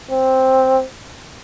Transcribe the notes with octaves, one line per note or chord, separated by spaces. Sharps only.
C4